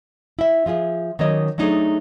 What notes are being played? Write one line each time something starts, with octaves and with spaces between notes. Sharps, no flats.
E4 E5
F3 F4 G#4 E5
D#3 F#3 A#3 C#4 C#5 D#5
F#3 A3 D4 D#4 G#4 A4